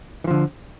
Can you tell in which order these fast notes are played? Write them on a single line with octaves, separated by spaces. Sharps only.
E3 F3 D3